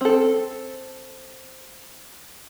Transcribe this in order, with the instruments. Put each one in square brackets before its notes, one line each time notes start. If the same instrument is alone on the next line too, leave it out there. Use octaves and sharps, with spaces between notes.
[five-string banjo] C4 A4